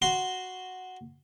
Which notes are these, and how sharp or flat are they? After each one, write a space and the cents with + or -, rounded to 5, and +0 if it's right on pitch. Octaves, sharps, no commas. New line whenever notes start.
F#4 +0 C6 +0